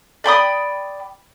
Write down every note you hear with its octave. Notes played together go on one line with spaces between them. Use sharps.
D5 G5 B5 D#6